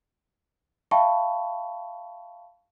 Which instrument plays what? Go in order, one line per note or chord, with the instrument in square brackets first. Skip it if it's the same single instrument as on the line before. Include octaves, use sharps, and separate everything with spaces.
[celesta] E5 F5 G5 A5 B5 C#6